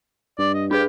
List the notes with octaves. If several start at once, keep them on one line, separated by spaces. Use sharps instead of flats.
G2 D5
D#5
D4 G4 G#4 B4